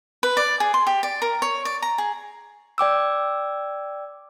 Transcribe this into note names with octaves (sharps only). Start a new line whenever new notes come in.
B4
D5
G#4
C6
G4
D5
A#4
C#5
D5
A#5
G#4
D5 G5 D6 E6